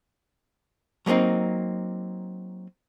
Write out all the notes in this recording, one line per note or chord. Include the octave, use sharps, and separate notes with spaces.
F#3 G3 A#3 C4 D#4